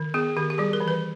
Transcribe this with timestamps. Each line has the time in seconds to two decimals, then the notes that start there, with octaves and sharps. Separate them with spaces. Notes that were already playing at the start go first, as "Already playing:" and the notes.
Already playing: D#3
0.14 B3 G#4
0.36 D#3 G4
0.50 G4
0.58 G3 G#4
0.73 A#4
0.80 E3
0.88 B4